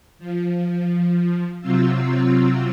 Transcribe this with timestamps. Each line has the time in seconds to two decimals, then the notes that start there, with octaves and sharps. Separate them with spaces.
0.19 F3
1.60 C3 F#3 C4 F4 E6